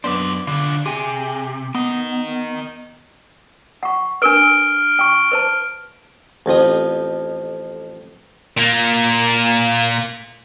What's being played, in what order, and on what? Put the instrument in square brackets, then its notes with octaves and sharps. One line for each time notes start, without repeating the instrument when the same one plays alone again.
[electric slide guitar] F#2 B3 D4 [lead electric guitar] C5 D5
[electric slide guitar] D3 [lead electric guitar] D4 F4
[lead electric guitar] C3 [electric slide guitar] G4 G#4 G#5
[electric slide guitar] B3 [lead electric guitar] A#4 D#5
[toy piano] F#5 C#6
[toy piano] D4 A#4 B4 [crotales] F6 D7 G7
[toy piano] G5 C#6
B4 C5 A5
[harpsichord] A1 F2 F3 D#6
[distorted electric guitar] A#2 A#3